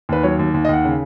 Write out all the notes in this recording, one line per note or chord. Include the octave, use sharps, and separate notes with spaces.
D#2 B4
F#3 C#5
D#2
D#2
D#5
D#2 F#5
C#3